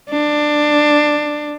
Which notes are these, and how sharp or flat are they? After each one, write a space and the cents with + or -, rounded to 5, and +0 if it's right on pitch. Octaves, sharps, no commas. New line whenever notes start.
D4 +15